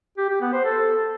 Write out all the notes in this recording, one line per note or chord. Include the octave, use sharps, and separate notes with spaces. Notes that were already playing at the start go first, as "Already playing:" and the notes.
G4
G4
B3
C5
A4